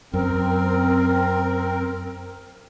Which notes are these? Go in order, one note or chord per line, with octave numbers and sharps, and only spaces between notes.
F#2 C4 A#4